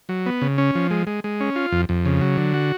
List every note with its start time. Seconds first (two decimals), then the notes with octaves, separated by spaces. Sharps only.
0.09 F#3
0.26 B3
0.42 C#3
0.58 C#4
0.75 F3
0.91 G#3
1.07 G#3
1.24 G#3
1.41 C#4
1.56 F4
1.72 F2
1.89 F2
2.05 C#3
2.21 F#3
2.37 D3
2.54 F#4